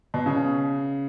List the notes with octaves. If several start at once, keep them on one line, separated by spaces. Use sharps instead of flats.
B2
C#3